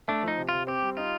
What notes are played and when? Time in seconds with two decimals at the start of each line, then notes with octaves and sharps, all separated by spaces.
0.08 A3 D4
0.23 F3 D#4
0.38 C3
0.49 C3 F4
0.67 C4 G4
0.82 G3
0.97 D#4 F4